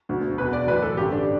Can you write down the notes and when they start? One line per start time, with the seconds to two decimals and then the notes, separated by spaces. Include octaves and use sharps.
0.09 E1 D2 D3
0.38 E1 E2 B2 B4
0.53 D5
0.67 B1 A2 E3 B4
0.83 A4
0.97 A1 G2 D3 G3 G4
1.12 D4